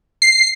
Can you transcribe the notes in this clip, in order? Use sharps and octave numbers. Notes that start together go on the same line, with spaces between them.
C7